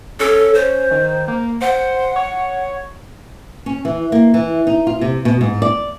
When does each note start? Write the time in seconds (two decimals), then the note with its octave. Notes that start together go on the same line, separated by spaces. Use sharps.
0.20 C#4 A4
0.54 C5
0.91 D#3
1.28 A#3
1.61 C5 F#5
2.16 C#5
3.66 C#4
3.85 E3
4.12 A#3
4.34 E3
4.67 D#4
4.87 F4
5.01 C3
5.25 B2
5.41 G#2
5.62 D5